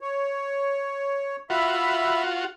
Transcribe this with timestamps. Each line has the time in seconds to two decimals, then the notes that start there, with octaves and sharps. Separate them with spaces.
0.01 C#5
1.50 F4 F#4 E5 B5